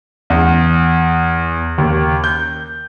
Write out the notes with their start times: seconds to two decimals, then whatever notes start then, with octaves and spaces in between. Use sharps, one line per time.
0.30 E2
1.78 D#2
2.24 G6